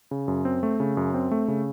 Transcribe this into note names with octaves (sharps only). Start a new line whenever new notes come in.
C#3
F#2
C4
A3
C#3
F#2
C4
A3
C#3